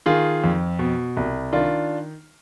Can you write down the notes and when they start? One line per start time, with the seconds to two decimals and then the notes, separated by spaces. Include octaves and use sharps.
0.06 D#3 F4 G#4
0.44 F2
0.79 B2
1.17 C2
1.53 D#3 D4 F4